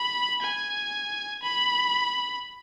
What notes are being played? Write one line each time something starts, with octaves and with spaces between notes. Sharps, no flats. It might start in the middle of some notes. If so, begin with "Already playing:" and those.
Already playing: B5
G#5
B5